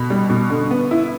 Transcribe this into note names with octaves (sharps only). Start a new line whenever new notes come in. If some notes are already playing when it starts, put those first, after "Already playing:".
Already playing: B2 B5
G3
B2
D3
B3
E4